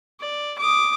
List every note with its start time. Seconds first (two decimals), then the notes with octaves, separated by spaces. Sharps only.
0.20 D5
0.58 D6 D#6